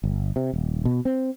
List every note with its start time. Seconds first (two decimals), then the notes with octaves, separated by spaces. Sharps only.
0.04 G1
0.36 C3
0.53 D#1
0.85 B2
1.05 C4